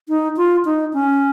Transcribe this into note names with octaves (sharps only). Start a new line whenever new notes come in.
D#4
F4
D#4
C#4